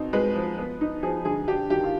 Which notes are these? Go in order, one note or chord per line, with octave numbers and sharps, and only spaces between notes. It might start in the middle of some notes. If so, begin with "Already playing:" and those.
Already playing: B2 C4 D#4
G#3 B4
F3
B3
D#4
F3 G#4
D3 G#4
D4 G4
D#3 G4
F4